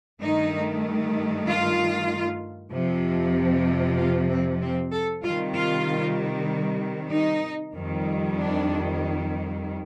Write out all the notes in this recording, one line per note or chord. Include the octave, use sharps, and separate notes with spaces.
G2 D#3 A3 D#4
F4
F2 C3 F3
F4
C4
C4
A4
C3 D#3 G3 F4
F4
D#4
F2 D#3 G3
D4